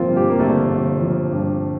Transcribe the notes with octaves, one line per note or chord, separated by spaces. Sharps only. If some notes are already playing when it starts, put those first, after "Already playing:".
Already playing: G1 F3 A#3 C4 F4
G2
G4
A#3
G1 A3
G1
F3
G2